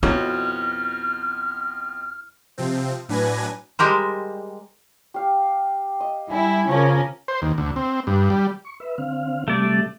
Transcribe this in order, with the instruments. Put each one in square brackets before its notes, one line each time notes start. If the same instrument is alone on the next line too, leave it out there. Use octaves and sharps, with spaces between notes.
[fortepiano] F2 B2 [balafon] D4 F#4 C#5 [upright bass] E4 [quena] F6
[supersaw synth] C3 F3 C4
A2 F#3 D4 B4 G#5 A#6
[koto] G3 G#3 G4 A#4 C5
[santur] G4 F5
D#5
[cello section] G3 E4 [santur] D5 G#5
[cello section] C#3 C#4 A#4 [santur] F3 C#5 D6
[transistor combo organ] C5
D#2
D2
C4
G2
G3
[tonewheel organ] C#6
B4 E5
D3 C4 F5
[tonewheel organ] C3 G3 [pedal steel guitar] A3 D5